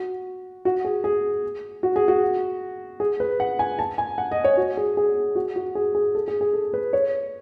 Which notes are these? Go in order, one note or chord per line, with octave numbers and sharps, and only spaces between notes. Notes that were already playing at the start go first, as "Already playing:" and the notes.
Already playing: F#4
F#4
G#4
G#4
F#4
G#4
F#4
G#4
B4
F#5
G#5
A5
G#5
F#5
D#5
C#5
F#4
G#4
G#4
F#4
F#4
G#4
G#4
A4
G#4
G#4
A4
B4
C#5